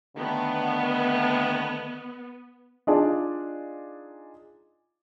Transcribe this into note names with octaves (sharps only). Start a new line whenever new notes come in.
D3 D#3 A3 B3
D4 D#4 F4 G#4 D5 A5